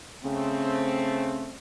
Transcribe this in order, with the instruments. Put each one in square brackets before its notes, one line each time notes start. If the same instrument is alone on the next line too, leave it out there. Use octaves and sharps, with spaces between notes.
[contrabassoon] C#3 [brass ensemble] A3 C4